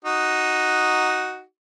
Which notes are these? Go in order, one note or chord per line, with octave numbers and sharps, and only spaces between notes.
D#4 F#4